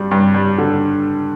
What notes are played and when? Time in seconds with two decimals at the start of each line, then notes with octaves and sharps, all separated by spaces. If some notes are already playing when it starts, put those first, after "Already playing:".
Already playing: G2 G3
0.11 G2
0.34 G3
0.58 D3